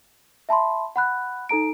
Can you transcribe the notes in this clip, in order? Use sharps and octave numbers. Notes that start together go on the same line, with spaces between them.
E5 A5 B5 C6
F#5 B5 F#6
D#4 A4 A#5 D7